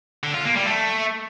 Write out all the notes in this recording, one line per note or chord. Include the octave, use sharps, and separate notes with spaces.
D3
F4
A#3
G3
A3